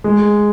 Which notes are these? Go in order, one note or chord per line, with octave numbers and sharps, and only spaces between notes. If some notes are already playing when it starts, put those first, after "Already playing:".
G#3